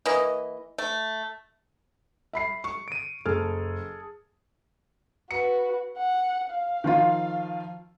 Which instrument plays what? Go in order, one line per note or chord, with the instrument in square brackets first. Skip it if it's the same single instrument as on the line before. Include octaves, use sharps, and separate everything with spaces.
[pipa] E3 A#3 D#5
A3
[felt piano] E5 B5 C7
C#6
[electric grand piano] D7 D#7
[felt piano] F#1 F6 [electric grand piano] G#4 A4
[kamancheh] F#4 B4 [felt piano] C#7
[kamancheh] F#5
F5
[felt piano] D#3 F3 F4